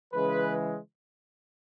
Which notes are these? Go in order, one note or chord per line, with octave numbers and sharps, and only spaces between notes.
C#3 E3 G#3 B4